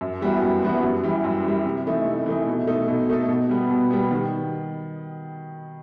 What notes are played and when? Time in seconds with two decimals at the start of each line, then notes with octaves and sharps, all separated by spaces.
0.01 F#2
0.21 E3 G3 B3 F#4
0.42 F#2
0.62 E3 G3 B3 F#4
0.83 F#2
1.04 E3 G3
1.24 F#2
1.45 E3 G3
1.65 C3
1.86 E3 A3 D#4
2.06 C3
2.26 E3 A3 D#4
2.47 B2
2.67 A3 D#4 A4
2.88 B2
3.09 A3 D#4 A4
3.28 B2
3.49 G3 B3
3.70 B2
3.91 G3 B3
4.11 D#3